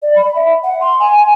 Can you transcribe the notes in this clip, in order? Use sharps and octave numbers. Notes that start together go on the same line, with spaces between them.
D5
B5
E5
F#5
C6
G#5
G#5